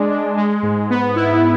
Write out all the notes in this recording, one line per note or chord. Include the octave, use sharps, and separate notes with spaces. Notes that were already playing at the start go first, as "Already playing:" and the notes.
Already playing: G#3 D4
D4
G#3
G#2
B3
E4